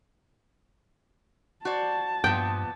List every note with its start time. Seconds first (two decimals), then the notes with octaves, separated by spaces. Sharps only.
1.65 F#4 C5 D5 A5
2.24 G2 A#2 F3 B3 G5